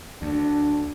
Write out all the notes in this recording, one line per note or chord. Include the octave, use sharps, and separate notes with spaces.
D2 D4